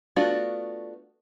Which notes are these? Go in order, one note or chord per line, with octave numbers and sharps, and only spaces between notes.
A3 B3 D4 F4 F#4